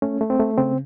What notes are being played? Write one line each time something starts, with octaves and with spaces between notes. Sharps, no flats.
A3 C#4
A3
C4
A3
C#3 C4